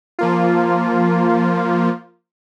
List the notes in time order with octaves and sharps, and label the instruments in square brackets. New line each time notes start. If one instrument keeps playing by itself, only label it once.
[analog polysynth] F3 A#3 F4